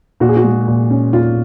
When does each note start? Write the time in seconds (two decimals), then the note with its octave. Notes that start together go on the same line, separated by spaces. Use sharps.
0.20 A#2 F#4
0.29 G#4
0.37 F#4
0.44 G#3
0.68 A#2
0.90 C#4
1.13 A#2 F4